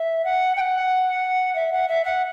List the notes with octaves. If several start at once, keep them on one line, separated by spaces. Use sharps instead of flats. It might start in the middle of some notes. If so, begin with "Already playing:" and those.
Already playing: E5
F#5
G5
F#5
E5
F#5
E5
F#5